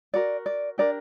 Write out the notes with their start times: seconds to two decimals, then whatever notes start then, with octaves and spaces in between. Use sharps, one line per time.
0.14 F#4 A#4 D5
0.46 D5
0.78 D4 G4 A#4 D5